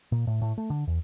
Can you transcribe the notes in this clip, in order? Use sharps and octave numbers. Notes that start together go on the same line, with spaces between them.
A#2
A2
A2
A3
D3
E2